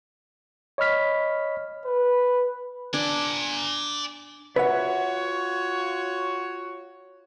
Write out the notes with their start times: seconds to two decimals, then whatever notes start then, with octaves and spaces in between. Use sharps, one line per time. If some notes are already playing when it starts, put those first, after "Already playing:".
0.78 C#5 D#5 B5 F6 B6
1.85 B4
2.94 D4 D5 G#5
4.56 F4 F#4 B4 C#5 E5 F#5